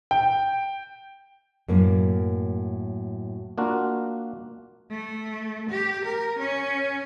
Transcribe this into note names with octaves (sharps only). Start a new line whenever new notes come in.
G5
F#2 A2 A#3
A#3 D4 F4 F#4
A3
G4
A#4
C#4